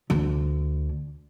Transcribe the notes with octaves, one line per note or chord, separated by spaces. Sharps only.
D2 D3